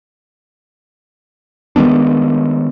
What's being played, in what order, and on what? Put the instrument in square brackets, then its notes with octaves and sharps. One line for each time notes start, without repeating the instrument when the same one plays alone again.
[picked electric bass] D#3 G#3 B3 D4